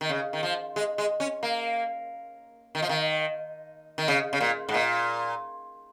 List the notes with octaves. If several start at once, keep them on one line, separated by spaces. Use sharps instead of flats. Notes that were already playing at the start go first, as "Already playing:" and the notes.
D#3
C#3
D#3
F3
G#3
G#3
C#4
A#3
D#3
F3
D#3
D#3
C#3
C#3
A#2
G#2
A#2